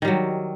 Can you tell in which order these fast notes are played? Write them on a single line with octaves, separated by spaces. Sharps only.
D#3 G3 F#3